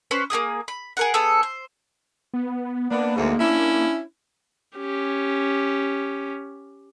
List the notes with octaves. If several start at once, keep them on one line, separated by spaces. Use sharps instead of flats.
C#4 B4 C5
A#3 D#4 G#4 D#6
B5
G#4 A#4 F#5
B3 G#4 A4
C5
B3
A#3 B3 D4
D2 G#2
C#4 D4 E4
C#4 G4